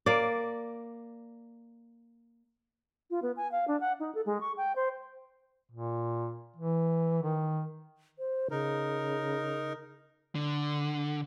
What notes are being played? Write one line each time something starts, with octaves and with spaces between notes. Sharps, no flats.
A#3 D5
F4
B3
G#5
F5
D4
F#5
D#4
A4
G#3
C#6
G5
C5
A#2
E3
D#3
C5
C#3 D#4 A#4
D3